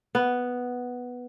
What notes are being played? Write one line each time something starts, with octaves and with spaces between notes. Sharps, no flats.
B3